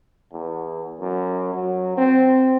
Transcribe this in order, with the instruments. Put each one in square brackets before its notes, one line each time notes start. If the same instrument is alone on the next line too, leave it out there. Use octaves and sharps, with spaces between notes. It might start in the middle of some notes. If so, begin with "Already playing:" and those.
[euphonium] E2
F#2
F#3
C4